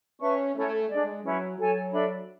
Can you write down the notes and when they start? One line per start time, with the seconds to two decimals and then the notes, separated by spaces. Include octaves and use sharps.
0.20 C#4 B4 E5 A5 C#6
0.55 A3 C#4 E4 A4 C#5
0.89 G#3 D4 G#4 D5
1.24 F#3 C#4 E4 B4
1.58 F#3 A4 C#5 G#5
1.93 D4 A4 E5 B5